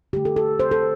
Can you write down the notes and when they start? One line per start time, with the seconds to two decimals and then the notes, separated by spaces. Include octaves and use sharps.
0.13 D3 A3 G4
0.25 A4
0.36 A4
0.60 C5
0.71 A4